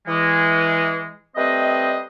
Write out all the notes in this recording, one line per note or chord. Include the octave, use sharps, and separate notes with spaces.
E3 G#3
G3 A3 C4 B4 C5 D#5